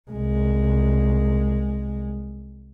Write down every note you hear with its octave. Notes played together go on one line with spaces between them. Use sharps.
C2 G#3